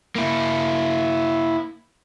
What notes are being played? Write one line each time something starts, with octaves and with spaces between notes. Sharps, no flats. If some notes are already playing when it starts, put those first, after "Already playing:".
A#3 E4